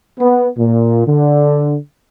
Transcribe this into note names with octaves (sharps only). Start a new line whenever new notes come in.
B3
A#2
D3